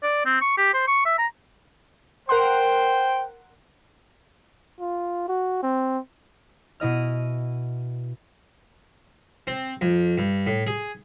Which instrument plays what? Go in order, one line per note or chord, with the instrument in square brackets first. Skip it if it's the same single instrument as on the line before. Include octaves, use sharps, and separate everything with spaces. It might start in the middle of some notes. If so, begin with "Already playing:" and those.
[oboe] D5
C4
C#6
G4
C5
C#6
E5
A#5
[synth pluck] A#4 F#5 C6 [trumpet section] C5 G5
[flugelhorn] F4
F#4
C4
[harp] B2 E4 D#5 F6
[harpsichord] C4
F2
G2
A2
G#4